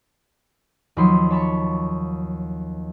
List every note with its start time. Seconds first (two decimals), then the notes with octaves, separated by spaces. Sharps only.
0.97 D#2 F3 F#3 C#5 B5 C6
1.30 C#5 A5 B5 C#6